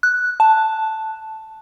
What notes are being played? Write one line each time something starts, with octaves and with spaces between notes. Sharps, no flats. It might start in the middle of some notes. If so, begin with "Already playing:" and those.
F#6
A5